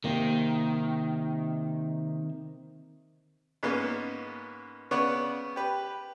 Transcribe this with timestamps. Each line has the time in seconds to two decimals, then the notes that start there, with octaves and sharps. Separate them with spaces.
0.04 C3 D#3 A#3
3.63 G#2 A#3 B3 C#4
4.91 C#3 B3 C#5 D5 F#5
5.56 G4 B4